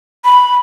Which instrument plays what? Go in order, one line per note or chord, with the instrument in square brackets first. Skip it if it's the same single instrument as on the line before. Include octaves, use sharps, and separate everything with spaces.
[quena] B5